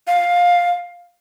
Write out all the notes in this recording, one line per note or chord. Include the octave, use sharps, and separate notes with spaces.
F5